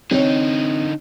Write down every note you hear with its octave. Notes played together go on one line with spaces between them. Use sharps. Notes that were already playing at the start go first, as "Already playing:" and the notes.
D3 C4 D#4 C#5